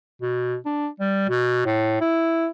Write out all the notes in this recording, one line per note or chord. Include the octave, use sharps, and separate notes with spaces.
B2
D4
G3
B2
A2
E4